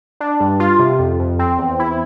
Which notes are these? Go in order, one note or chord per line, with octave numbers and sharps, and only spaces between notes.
D4
G2
F4
C3
F2
F2
C4
E2
E4